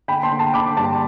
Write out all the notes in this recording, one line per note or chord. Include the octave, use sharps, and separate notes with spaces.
D3 G5 B5
A5 C6
D3
A5 C6
D3 B5 D6
G2 A5 C6